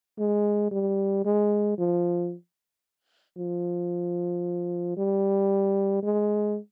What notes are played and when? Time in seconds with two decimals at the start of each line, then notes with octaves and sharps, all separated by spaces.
0.19 G#3
0.71 G3
1.25 G#3
1.78 F3
3.37 F3
4.97 G3
6.03 G#3